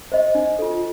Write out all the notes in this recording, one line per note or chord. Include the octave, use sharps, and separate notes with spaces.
C5 D#5
D4
F4 A4